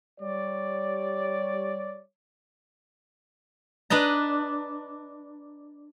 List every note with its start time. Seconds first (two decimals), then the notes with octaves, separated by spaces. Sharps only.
0.20 G3 C#5 D5
3.90 D4 B4 D#5 A#5